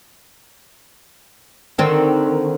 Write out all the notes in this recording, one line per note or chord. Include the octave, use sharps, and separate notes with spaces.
D3 D#3 C4